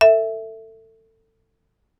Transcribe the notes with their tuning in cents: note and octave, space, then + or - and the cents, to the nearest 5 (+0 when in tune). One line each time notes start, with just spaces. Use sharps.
A4 +25 E5 +0